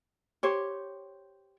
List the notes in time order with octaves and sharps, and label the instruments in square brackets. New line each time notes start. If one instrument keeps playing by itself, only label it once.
[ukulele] G4 C5 C#5